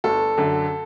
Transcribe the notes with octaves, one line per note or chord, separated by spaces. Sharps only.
G1 A4
F#2 D3